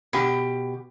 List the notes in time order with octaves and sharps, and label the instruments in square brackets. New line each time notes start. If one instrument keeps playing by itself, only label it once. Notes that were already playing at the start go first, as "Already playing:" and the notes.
[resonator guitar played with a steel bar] B2 G4